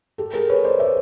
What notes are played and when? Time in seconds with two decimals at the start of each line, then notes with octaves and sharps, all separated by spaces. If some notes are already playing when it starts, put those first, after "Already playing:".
0.18 G4 A4
0.33 G#4 A#4
0.50 B4 C#5
0.64 C5 D5
0.79 D5 E5